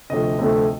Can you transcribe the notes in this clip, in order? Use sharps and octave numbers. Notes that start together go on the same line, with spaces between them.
D2 C3 F3 A3 D#5
D2 C3 F3 A3